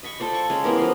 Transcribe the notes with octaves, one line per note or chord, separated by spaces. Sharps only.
D#5 B5 C#6
F4 A4 C5 D5
C#6
G#3 C#4
E3 B3 G4 A#4
F3 F5